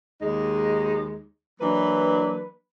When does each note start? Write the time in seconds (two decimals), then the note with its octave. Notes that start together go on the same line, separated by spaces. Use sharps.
0.21 D#2 G#3 D#4
1.61 E3 F#3 A#3 D4 B4